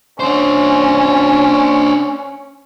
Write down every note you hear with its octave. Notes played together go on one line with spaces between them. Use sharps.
C#4 D4 C5